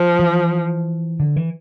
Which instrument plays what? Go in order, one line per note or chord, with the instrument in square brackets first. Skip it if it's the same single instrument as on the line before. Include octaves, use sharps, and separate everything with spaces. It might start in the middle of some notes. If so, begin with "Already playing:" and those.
Already playing: [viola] F3
[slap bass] E3
D3
E3